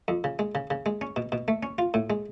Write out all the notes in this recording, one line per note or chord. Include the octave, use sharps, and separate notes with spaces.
F2
C#3
G#3
C#3
C#3
G#3
C#4
B2
B2
A3
C#4
F4
A2
G#3